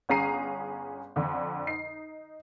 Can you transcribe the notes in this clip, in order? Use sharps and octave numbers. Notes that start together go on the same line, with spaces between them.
G1 C#4 G#4 A#5 C7 D#7
F2 D3
D#4 C7